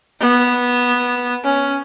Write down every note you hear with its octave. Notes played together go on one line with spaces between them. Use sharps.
B3
C#4